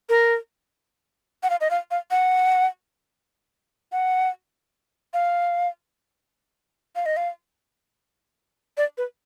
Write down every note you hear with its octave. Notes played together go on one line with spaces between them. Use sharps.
A#4
F#5
F5
D#5
F5
F5
F#5
F#5
F5
F5
D#5
F5
D5
B4